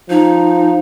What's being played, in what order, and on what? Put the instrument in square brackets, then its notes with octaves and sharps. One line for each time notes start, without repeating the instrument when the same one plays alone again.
[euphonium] F3 [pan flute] D#4